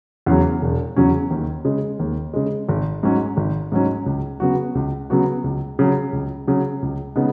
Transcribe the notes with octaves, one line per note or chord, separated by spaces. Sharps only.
E2 C#3 F#3 C#4
E1
E2 C#3 F#3 C#4
D#2
C#3 G#3
D#2
C#3 G#3
G#1
G#2 F#3 C#4
G#1
G#2 F#3 C#4
C#2
C#3 F#3 B3 F#4
C#2
C#3 F#3 B3 F#4
C#2
C#3 F#3
C#2
C#3 F#3
C#2
C#3 G#3 B3 D#4